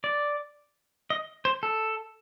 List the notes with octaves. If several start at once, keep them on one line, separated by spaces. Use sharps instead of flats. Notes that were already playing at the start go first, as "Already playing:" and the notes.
D5
D#5
C5
A4